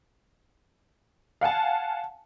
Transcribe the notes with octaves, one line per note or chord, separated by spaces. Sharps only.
F5 F#5 G#5 A5